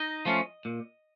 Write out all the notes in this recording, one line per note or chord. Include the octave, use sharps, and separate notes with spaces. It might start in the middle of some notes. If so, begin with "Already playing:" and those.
Already playing: D#4 D#5
F3 A3 C#4 F4
A#2